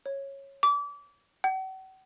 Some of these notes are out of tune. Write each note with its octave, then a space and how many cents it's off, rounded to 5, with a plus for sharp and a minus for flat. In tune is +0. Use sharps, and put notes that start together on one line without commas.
C#5 -10
D6 -30
F#5 +45